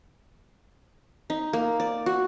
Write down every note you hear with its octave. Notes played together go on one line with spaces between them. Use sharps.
D#4
A#3
D5
F#4